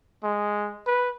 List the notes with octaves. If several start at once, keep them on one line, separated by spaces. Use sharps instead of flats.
G#3
B4